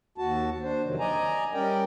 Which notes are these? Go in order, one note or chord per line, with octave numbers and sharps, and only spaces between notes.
D#2 F#4 A5
D4 C5
F2 C3 D#3 F#3
D5 D#5 G#5 A#5
G3 C#4 A#4 D5 G5